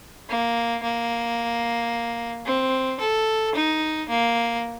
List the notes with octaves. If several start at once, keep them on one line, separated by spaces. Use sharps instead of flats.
A#3
A#3
C4
A4
D#4
A#3